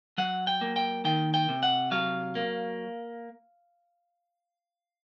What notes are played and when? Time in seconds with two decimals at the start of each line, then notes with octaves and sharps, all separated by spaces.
0.18 F#3 F#5
0.47 G5
0.61 A#3
0.76 G5
1.05 D#3 G5
1.34 G5
1.49 C3
1.63 F#5
1.91 F#3 F5
2.35 A#3